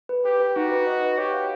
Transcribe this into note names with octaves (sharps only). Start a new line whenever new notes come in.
B4
G4 B4
B4
D#4 F#4
B4
D#5
B4
G4 C#5
F5